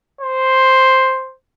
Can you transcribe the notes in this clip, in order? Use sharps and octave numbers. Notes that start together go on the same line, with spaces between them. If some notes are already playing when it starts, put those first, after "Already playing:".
C5